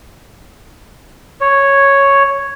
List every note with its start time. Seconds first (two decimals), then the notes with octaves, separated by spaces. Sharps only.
1.41 C#5